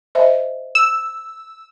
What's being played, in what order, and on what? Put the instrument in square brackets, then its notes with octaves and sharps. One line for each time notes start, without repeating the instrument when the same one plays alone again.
[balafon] C5 D#5 E5
[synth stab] E6